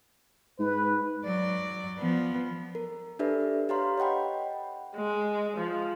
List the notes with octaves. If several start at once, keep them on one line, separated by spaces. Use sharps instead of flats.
G#2 B4
F#3 D5
F3 B3
A#4
D4 G4 A4 B4 D5 E5
G4 B4 C#5 F5 A#5 C6
C#5 D#5 F#5 G5 B5
G#3
F3